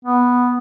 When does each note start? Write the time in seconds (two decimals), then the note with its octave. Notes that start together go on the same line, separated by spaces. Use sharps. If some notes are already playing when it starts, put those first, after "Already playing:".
0.05 B3